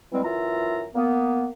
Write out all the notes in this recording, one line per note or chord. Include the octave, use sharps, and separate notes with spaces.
B2 E3 G3 G#3 C4
F#2 E3 F4 E5 A#5
A#3 B3